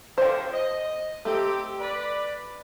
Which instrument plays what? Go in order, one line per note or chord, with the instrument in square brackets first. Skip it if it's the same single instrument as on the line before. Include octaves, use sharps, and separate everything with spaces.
[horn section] D3 F3 [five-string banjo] C5 G5
[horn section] D#5
[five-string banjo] A3 [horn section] C4 D#4 G4
[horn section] B4 D5